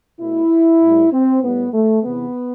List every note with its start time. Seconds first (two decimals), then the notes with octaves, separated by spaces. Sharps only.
0.21 B2 A3 E4
0.82 A2 G3
1.13 C4
1.43 A2 G3 B3
1.73 A3
2.04 E2 C3 E3 B3